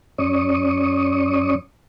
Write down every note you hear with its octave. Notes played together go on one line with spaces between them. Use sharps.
F#2 C#4 D5 C#6 D#6